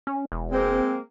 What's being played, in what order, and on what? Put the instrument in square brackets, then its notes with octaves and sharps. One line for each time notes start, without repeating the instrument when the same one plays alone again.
[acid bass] C#4
E1
[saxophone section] G#3 A#3 C4